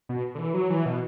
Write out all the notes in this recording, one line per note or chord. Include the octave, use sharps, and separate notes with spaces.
B2
D3
E3
F#3
E3
B2